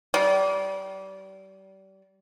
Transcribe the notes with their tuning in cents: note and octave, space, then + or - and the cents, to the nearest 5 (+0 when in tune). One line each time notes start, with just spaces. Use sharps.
G3 -30